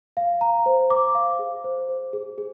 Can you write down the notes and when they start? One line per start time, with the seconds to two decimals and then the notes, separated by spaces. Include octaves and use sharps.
0.17 F5
0.41 A#5
0.66 C5
0.90 D6
1.15 F5
1.39 G#4
1.64 C5
1.89 C5
2.13 G#4
2.38 G#4